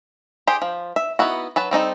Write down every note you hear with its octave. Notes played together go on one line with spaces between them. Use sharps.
G4 G#4 C5 G5
F3
E5
B3 D#4 E4 F#4
F#3 B4 A5
G3 C4 D#4 A4